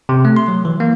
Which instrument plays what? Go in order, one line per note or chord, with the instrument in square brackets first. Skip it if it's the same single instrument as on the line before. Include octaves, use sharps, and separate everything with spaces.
[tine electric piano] C3
A3
C6
F#3
E3
A#3